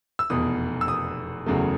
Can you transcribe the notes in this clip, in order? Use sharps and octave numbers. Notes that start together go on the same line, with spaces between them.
E6
F1 E2 B2 D#6
E6
D#6
F#1 E2 C#3 F#3 A3